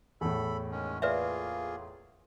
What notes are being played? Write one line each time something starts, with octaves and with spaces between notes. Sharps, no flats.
E2 A2 A4 B5
D#3 G#3 C#4
A#3 F4 G#4 B4 D5 E5